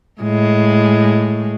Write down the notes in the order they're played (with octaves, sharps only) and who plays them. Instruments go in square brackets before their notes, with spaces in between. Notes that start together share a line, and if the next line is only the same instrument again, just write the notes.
[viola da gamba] A2 G#3